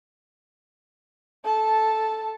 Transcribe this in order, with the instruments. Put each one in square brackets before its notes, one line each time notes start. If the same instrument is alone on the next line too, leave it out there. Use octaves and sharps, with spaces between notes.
[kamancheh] A4 A5